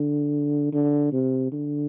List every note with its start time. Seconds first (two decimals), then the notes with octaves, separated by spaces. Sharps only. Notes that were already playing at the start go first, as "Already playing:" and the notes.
Already playing: D3
0.72 D3
1.12 C3
1.52 D3